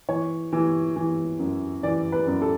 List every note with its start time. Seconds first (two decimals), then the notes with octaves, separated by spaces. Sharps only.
0.09 E3 C#5
0.53 E3
0.96 E3
1.39 F#2
1.83 E3 D5
2.12 B4
2.27 F#2
2.42 A4